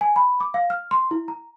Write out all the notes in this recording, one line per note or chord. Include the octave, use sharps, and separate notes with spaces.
G#5
B5
D6
F5
F6
C6
E4
A#5